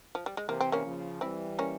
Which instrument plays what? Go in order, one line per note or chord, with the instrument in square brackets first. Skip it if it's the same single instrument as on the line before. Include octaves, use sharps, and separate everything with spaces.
[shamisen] F3
G3
G#3
[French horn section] C3 E3 [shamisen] A#3
[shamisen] C4
A#3 C#4
[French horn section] C#3 F3
[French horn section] E3 G3 [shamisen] C4 E4
[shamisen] A#3 C#4